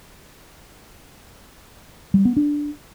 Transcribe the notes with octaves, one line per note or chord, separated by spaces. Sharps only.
G3
B3
D4